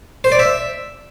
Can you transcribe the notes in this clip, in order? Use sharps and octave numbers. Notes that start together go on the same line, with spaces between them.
C5
D5
E5